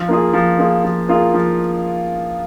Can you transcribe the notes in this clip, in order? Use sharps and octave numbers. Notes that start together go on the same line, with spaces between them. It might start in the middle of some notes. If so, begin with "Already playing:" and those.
Already playing: F3
A#3 F4 G#4
F3
A#3 F4 G#4
F3
A#3 F4 G#4
F3